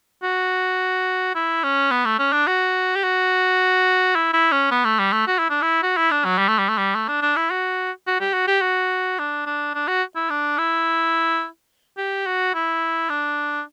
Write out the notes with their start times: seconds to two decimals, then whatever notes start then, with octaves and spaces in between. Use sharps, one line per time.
0.23 F#4
1.35 E4
1.63 C#4
1.91 B3
2.05 A3
2.19 C#4
2.33 D4
2.47 F#4
2.96 G4
3.04 F#4
4.16 E4
4.33 E4
4.52 C#4
4.71 B3
4.85 A3
4.99 G3
5.13 A3
5.27 F#4
5.39 E4
5.50 D4
5.62 E4
5.83 F#4
5.97 E4
6.11 D4
6.25 F#3
6.38 G3
6.48 A3
6.58 G3
6.69 A3
6.78 G3
6.95 A3
7.08 D4
7.22 D4
7.36 E4
7.51 F#4
8.07 F#4
8.20 G4
8.33 F#4
8.47 G4
8.61 F#4
9.19 D4
9.46 D4
9.75 D4
9.88 F#4
10.16 E4
10.30 D4
10.58 E4
11.97 G4
12.26 F#4
12.55 E4
13.09 D4